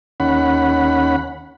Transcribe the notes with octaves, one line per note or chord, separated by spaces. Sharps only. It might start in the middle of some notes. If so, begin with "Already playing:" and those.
D#2 C#4 F#5 B5